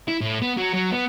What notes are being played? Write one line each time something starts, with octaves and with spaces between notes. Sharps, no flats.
E4
A2
B3
F#3
F#3
B3